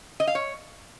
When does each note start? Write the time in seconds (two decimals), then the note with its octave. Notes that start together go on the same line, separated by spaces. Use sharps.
0.20 D#5
0.27 F5
0.35 C#5